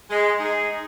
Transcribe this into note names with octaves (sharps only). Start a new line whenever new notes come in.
G#3
D#4 G#4